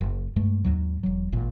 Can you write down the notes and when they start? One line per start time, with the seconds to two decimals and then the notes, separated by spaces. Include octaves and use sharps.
0.01 F#1
0.36 G2 G#3 A3
0.64 D#2 G#2 F#3
1.03 E1 F#3
1.32 G#1 A#2